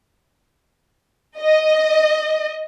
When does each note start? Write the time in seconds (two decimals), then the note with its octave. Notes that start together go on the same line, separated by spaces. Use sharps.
1.40 D#5